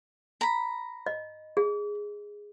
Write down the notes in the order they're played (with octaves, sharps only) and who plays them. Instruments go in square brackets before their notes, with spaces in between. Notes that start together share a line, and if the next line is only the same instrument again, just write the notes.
[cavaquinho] A#5 B5
[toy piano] D#5
G#4